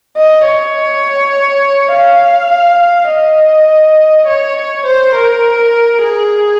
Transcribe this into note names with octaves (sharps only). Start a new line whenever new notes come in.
D#5
C#5
F5
D#5
C#5
C5
A#4
G#4